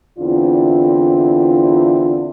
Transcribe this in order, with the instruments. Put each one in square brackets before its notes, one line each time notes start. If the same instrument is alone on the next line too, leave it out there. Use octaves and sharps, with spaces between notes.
[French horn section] E2 D3 C4 E4 F4 D5